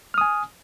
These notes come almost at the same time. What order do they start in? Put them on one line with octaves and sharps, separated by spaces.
F6 D#6 G#5